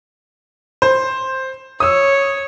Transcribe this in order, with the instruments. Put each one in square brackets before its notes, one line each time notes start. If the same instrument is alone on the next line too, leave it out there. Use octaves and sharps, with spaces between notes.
[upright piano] C5
[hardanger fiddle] C#5 [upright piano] D#6 E6